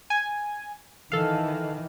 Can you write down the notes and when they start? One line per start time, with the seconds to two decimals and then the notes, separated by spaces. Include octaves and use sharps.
0.10 G#5
1.12 D#3 E3 A4 F5